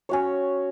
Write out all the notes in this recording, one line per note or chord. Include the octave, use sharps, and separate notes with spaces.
C#4 F#4 C#5